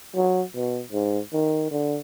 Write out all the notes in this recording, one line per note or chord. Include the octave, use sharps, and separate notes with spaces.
F#3
B2
G#2
D#3
D3